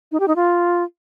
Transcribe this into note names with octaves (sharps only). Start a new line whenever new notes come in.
D#4
G4
D#4
F4